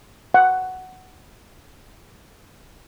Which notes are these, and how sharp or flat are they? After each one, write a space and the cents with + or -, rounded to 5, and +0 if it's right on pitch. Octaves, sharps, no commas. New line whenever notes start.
F#5 +5